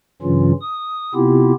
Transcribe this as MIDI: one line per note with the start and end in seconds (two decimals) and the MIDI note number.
0.22 0.52 43
0.22 0.52 49
0.22 0.52 52
0.22 0.52 54
0.22 0.52 61
0.22 0.52 65
0.62 1.14 87
1.15 1.53 48
1.15 1.53 59
1.15 1.53 60
1.15 1.53 64
1.15 1.53 65
1.15 1.53 67